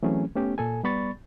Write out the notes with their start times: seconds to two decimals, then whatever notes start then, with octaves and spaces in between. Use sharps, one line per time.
0.03 E3 F#3 A3 C4 C#4 G#4
0.35 A3 B3 C#4 G4
0.58 A#2 A4 G#5
0.83 G3 B3 D5 B5 C#6 A6